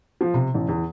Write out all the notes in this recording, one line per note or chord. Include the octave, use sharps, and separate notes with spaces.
F3
C3
A1
E2